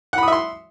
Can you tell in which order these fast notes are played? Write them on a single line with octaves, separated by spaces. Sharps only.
F#5 B5 D#6 E5 C6